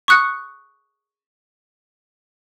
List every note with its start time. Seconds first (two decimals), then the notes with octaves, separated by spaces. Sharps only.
0.08 C#6 D#6 F#6 C#7